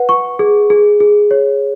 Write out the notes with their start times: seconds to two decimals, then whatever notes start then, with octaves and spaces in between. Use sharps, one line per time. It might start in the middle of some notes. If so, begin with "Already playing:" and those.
Already playing: B4 F#5
0.09 C#6
0.39 G#4
0.70 G#4
1.00 G#4
1.31 C#5